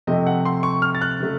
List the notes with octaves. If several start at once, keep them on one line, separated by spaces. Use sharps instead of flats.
F2 C3 F3 A3 C4 D#5
F#5
C6
C#6
F6
A6
F#6
C#3 F#3 A3